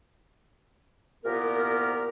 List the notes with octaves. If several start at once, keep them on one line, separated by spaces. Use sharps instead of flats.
C2 A#2 B3 G4 A#4